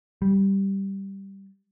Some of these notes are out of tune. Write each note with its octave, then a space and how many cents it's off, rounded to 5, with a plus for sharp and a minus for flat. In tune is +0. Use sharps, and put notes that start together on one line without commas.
G3 -5